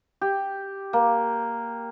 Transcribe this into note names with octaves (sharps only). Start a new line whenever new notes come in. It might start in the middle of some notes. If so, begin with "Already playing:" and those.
G4
A#3